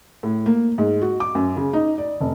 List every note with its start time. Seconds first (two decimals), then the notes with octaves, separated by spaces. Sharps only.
0.23 A2
0.46 A#3
0.78 G#2
1.02 F#4
1.20 D6
1.35 F#2
1.57 C#3
1.73 D#4
1.98 D5
2.20 F1